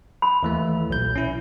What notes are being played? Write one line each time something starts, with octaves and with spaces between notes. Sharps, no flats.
B5
D#2 E3 A3
B1 A#2 G6
C#4 E4